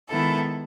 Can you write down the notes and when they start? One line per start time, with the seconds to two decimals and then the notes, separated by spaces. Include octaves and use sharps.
0.10 D#3 G#3 B3 E4 A4